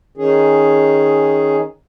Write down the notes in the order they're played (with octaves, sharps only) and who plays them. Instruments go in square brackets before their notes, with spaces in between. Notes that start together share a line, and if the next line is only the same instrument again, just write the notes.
[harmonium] D#3 C#4 G#4